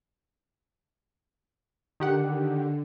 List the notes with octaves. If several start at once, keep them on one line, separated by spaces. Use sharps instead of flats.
D3 D#3 G4 F#5